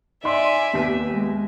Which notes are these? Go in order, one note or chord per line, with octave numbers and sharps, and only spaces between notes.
D#4 D5 E5 G#5 C6
D#2 B3 B6
G#3